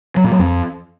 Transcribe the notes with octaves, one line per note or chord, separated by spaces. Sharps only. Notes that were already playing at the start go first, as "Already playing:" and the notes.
F#3
A#2
F#3
F2